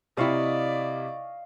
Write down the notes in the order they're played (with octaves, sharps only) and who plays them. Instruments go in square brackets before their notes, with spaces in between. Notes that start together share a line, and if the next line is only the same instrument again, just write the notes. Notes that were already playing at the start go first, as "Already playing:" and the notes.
[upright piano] C3 E4 [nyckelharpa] D5 [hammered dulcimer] D#5 F5 C#6